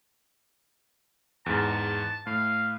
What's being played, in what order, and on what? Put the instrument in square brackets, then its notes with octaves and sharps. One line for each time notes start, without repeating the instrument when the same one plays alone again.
[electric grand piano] E2 G#2 [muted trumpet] A5
[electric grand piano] A2 [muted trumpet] F5